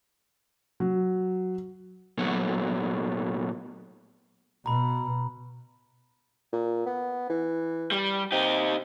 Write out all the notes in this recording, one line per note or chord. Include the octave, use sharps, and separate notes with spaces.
F#3
A#2 F#3 A3 B3
B2 A#5 B5
A#2
B3
E3
G3
C3 D#4 G4